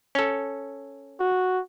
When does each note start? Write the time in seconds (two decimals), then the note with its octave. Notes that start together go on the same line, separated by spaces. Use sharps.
0.15 C#4 A4
1.20 F#4